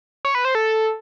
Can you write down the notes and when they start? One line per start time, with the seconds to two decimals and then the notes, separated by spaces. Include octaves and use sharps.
0.25 C#5
0.35 B4
0.45 C5
0.55 A4